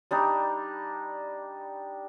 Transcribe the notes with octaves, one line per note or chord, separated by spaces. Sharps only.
G3 D4 D#4